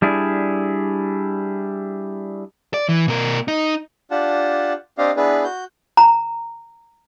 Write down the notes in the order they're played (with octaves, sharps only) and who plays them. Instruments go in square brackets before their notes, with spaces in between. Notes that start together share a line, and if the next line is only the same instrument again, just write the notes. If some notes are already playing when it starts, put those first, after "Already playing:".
[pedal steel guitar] G3 D4 E4 G#4
[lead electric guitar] D5
E3
B2 A#4
D#4
[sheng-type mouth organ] D4 F4 G4 F#5 A5
C4 D4 G4 D#5 F5
B3 D4 E4 G#4 B4
F#4 G6
[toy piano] A#5